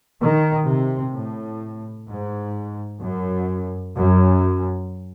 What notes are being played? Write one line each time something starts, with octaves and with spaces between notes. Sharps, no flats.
D#3
C3
A2
G#2
F#2
F#2